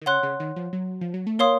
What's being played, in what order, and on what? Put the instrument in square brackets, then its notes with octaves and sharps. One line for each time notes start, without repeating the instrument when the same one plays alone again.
[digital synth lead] D#3
[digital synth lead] C#3 [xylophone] C#5 F#5 C6 F#6
[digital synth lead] C#3
D#3
F3
F#3
F3
F#3
A3
[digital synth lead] A#3 [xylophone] A#4 C#5 F5 C6 D#6